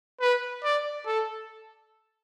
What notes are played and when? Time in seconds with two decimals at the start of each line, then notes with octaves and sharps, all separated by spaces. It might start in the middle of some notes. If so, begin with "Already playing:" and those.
0.21 B4
0.64 D5
1.07 A4